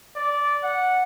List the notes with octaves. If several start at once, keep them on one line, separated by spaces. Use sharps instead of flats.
D5
F#5